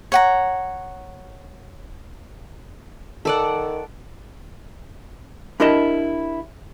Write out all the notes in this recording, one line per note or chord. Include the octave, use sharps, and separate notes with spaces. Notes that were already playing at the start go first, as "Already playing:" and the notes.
C#5 F#5 A#5
D#3 A4 D5 F#5
D4 E4 G4 A#4 D#5 A5